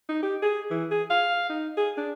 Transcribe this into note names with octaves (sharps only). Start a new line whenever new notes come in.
D#4
G4
G#4
E3
G#4
F5
D#4
G#4
D4